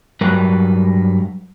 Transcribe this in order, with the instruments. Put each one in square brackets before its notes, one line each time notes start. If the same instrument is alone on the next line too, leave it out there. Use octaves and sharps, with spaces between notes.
[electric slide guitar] G2 F#3 A#4 B4